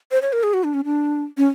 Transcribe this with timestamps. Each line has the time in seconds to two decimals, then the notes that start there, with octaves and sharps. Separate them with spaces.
0.11 C5
0.22 C#5
0.33 A#4
0.43 G#4
0.54 F#4
0.64 D4
0.74 C#4
0.85 D4
1.37 C#4